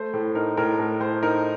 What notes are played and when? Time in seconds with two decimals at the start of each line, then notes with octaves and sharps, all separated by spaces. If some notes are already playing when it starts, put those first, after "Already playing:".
Already playing: A3 C5
0.14 A2
0.35 D#4 A#4
0.57 A2 A#4
0.79 A3 A#4
1.00 A2 C5
1.23 D#4 A#4